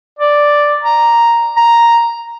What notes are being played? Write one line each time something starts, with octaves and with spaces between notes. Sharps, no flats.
D5
A#5
A#5